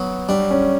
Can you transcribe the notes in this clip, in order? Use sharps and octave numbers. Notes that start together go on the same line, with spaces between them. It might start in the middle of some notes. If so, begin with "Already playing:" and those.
Already playing: F#3 B3
G3 D4
C#4